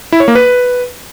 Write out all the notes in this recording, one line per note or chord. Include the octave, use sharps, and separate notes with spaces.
E4
C#5
A#3
B4